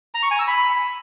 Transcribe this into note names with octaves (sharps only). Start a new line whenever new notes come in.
A#5
C#6
G#5
E6
B5